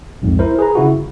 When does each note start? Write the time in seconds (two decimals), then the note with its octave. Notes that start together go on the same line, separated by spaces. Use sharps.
0.22 B1 F2 G#2
0.39 E4 A#4 C5
0.59 G#4 B4 A#5
0.75 C#3 E4 F#4
0.93 G1